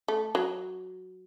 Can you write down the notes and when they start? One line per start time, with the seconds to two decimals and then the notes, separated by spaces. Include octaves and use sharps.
0.08 A3
0.35 F#3